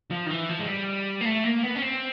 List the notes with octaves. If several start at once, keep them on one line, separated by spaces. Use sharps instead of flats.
F3
D#3
E3
F3
G#3
G3
A#3
A3
A#3
B3
C#4
C4